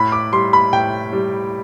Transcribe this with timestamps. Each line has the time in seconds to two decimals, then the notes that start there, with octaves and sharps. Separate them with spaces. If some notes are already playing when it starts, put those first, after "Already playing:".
Already playing: A2 B5
0.12 D6
0.33 G3 C6
0.53 B5
0.73 A2 G5
1.13 G3